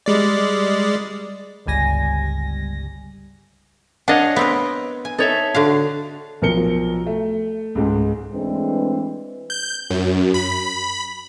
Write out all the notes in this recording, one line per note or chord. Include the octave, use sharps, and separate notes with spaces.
G3 G#3 D5
G1 C#2 G3 G#5 A#6
D4 C#5 D#5 F5 F#5
B3 C4 A#4
G#5
D#4 A4 C#5 E5
D3 F#4 F5
B1 F3 A#4 C#7 G7
A3
C#2 G#2 G#3
E3 G#3 A3 C4 D4 B4
G6
F#2
B5